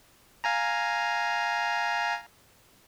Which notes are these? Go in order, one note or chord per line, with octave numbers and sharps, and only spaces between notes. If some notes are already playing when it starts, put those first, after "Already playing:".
F5 G#5 A#5